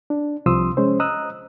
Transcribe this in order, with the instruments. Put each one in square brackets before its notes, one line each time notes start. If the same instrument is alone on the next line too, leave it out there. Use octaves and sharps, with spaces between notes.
[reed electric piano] D4
C2 C3 F3 C6 D#6 E6
G#3 C#4 C5
D#5 A#5 D#6 E6 F#6